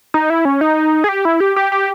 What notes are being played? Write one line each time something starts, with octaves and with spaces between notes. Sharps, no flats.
D#4
E4
C#4
D#4
G#4
G4
E4
G4
G4
G4